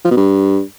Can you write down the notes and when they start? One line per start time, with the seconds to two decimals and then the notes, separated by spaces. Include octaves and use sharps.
0.05 F3
0.11 B2
0.17 G2